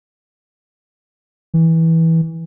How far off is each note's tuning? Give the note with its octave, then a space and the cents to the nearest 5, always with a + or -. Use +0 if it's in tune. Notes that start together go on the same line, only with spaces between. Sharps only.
E3 -15